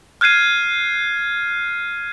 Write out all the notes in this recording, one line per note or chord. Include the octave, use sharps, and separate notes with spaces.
F6 F#6 G#6 C7 D#7